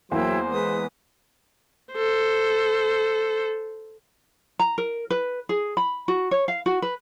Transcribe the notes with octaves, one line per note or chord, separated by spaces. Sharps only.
E2 F#3 A#3 E4 C5 G5
G#3 B4 D#6
A4 C5
A#5
A#4
B4
G#4
B5
F#4
C#5
F5
F#4
B4